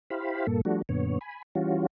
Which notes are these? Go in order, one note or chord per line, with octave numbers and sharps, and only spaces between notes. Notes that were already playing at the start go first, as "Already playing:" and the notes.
E4 G4 C5 F5 B5
G2 A#2 A#3 A4
F3 G3 A3 D4 F#4
F#2 A#2 D3 B3 C#5
G#5 B5
E3 G3 C#4 F4 F#4